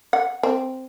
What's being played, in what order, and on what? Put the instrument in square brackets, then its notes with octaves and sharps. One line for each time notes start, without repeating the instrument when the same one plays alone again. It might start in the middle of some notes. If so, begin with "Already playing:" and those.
[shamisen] F#5
C4